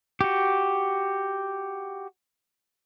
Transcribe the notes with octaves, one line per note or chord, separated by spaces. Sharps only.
F#4 G4